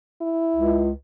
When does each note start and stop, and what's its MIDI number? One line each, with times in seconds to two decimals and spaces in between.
0.21 0.87 64
0.56 0.90 37